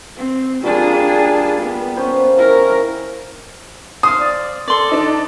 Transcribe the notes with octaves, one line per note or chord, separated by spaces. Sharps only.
C4
G3 A#3 D4 F4 G#4
B3
C#4 C5
E4 A#4
C5 F5 D#6
D5
A4 D5 C6
D4 D#4 A5